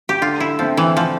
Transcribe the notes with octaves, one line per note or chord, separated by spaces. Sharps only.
G4
D3 F4
E4
F3 A3 C4
E3
D3 F3